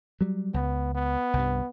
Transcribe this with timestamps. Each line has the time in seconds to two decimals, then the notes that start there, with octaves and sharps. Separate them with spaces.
0.21 F#3 G3
0.54 C#2 B3
0.95 B3
1.34 C2 G2